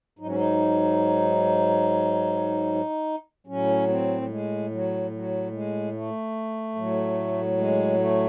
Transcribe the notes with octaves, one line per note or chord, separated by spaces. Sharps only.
G#2 F#3 D#4
C#4
D#4
A2 F#3 C#4
C4
F#3
G#3
F#3
F#3
G#3
A3
A2 F#3
G#3
A3